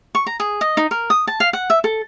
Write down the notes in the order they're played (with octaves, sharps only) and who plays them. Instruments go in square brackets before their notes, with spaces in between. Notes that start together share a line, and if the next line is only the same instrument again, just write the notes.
[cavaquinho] C#6
A#5
G#4
D#5
D#4
A#4
D#6
A5
F5
F#5
E5
A4